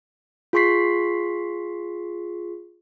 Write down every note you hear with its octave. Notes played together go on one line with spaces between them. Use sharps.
F4 G#4 C6 C#6 B6 C7